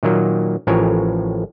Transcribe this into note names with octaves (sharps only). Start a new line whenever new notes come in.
A#2 D#3 F#3 A#3
A1 A2 F3 A#4 C#5 G#5